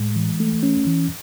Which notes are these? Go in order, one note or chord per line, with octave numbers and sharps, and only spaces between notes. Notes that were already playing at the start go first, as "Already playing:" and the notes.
Already playing: A2 G#3
E3
A3
C#4
E3